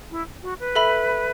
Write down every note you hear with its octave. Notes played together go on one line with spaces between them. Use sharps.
E4
F#4
B4
A4 E5 B5